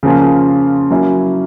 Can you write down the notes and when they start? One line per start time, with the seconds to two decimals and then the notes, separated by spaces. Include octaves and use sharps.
0.03 C#3 F3 A#3 C#4 F4
0.90 F#3 A#3 C#4 E4